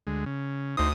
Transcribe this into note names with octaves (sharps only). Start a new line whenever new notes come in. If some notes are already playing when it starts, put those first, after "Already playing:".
D2 G#3
C#3
D2 D#4 C5 D#6